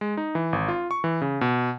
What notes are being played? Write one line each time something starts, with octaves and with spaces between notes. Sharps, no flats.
G#3
D#4
E3
G#1
F4
C#6
E3
C#3
B2